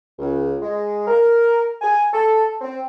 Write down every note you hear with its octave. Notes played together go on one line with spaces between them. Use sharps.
C#2
G#3
A#4
G#5
A4
C4